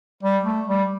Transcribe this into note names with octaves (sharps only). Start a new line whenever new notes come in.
G3
A3
G3